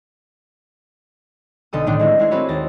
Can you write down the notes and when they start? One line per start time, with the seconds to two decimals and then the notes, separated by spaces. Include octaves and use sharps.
1.73 B1 D3 A4 D#6
1.86 A2 D3 D#3 D4 D#4 A4
1.99 G#3 A3 C4 E4
2.19 G#3 A3 E4 G#4
2.31 C4 F#4 B4 C#5
2.48 D#2 A6 A#6